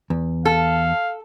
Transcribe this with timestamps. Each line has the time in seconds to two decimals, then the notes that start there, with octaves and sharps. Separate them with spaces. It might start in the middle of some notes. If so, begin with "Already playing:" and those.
0.10 E2
0.45 A4 F5